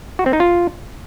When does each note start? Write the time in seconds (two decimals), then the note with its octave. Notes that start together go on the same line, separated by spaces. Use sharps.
0.19 F#4
0.26 C4
0.33 D#4
0.40 F4